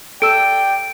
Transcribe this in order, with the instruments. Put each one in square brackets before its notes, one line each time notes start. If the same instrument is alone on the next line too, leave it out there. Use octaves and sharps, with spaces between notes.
[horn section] G4 D5 G5 [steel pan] A4 E6 [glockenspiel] D7